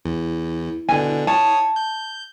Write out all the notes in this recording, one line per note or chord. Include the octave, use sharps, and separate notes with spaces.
E2 E4
B2 D3 G#5
C#5 A5 D#6
G6